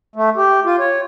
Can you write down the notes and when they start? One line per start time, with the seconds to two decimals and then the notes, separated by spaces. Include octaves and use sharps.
0.16 A3
0.37 G4
0.65 F4
0.79 C#5